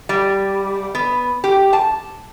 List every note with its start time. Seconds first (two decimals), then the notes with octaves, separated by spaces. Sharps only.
0.09 G3
0.95 B3
1.44 G4
1.73 A5